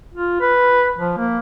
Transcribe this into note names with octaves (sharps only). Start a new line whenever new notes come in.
F4
B4
F3
A#3